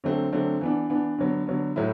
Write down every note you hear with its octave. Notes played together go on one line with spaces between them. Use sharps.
D3 F#3 A3 C4
D3 F#3 A3 C4
E3 B3 D4
E3 B3 D4
D3 F#3 B3
D3 F#3 B3
A2 F#3 A3 E4